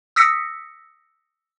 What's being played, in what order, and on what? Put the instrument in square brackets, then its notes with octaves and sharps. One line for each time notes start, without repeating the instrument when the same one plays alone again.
[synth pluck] D#6 E6 A#6 B6 C#7